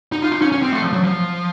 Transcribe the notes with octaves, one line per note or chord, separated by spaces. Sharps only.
D#4
F4
D#4
C#4
C#4
C4
A3
F3
F#3
F3